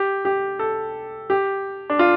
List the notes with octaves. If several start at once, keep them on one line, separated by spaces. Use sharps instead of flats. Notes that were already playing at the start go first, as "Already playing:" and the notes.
Already playing: G4
G4
A4
G4
D4
F4